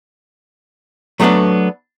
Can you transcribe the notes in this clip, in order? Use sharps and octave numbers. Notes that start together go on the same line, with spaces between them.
F#3 A3 B3 C4 D4 A4